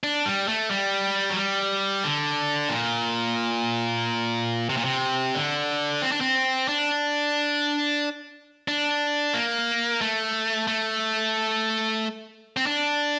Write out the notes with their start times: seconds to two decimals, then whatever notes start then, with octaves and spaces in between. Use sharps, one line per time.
0.04 D4
0.25 G3
0.48 A3
0.71 G3
1.30 F#3
1.36 G3
2.04 D3
2.69 A#2
4.69 C3
4.77 A#2
4.85 C3
5.35 D3
6.02 C4
6.12 D4
6.21 C4
6.68 D4
8.68 D4
9.34 A#3
10.01 A3
10.67 A3
12.57 C4
12.66 D4